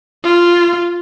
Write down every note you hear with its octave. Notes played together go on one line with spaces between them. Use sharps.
F4